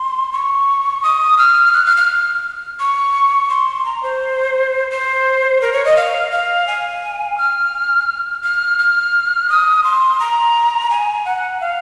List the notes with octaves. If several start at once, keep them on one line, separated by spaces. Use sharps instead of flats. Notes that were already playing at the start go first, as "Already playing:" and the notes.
Already playing: C6
C#6
D#6
F6
F#6
F6
F6
C#6
C6
A#5
C5
C5
A#4
C#5
D#5
F5
F5
G#5
F6
F6
F6
D#6
C6
A#5
G#5
F#5
F5